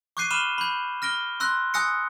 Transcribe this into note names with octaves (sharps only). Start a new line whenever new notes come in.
C#6 D6 F#6 G6 C7 D#7
B5 D6 F6 D#7 E7 G7
B5 G6
F6 A#6 D7 G7
C6 E6 F#6 A#6
G#5 D#6 E6 F#6 A#6 C#7